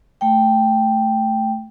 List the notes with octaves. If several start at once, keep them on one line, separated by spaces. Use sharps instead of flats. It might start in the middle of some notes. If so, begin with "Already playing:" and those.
A3 G5